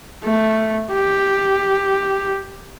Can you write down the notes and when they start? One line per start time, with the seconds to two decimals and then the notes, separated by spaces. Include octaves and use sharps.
0.24 A3
0.93 G4